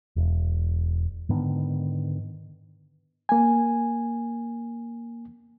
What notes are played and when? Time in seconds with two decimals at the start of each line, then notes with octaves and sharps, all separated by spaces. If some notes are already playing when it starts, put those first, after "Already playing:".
0.16 E1
1.29 G#2 D3 D#3 B3
3.29 A#3 G#5